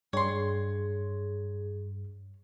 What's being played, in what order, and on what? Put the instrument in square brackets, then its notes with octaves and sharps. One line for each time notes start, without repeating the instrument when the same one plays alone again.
[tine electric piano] G2 [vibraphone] G#4 [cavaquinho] C#5 C6